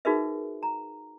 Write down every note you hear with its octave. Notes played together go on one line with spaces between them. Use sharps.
D#4 F#4 G#4 A#4 B4 E5
A#5